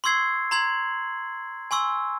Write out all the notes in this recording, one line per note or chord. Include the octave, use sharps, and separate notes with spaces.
C6 C#6 E6 G#6 C7
A#5 C6 G#6 F#7
G#5 C6 C#6 E6